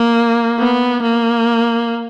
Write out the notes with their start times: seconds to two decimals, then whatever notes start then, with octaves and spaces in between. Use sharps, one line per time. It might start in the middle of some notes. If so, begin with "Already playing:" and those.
Already playing: A#3
0.59 B3
1.02 A#3